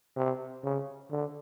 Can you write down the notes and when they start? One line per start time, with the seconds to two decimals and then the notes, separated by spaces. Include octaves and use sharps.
0.16 C3
0.63 C#3
1.11 D3